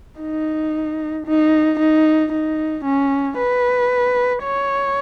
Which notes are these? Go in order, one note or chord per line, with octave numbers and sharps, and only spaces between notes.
D#4
D#4
D#4
D#4
C#4
B4
C#5